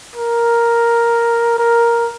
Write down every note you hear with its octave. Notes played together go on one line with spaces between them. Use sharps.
A#4
A#4